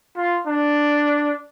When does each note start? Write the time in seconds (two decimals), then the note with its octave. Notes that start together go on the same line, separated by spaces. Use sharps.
0.16 F4
0.46 D4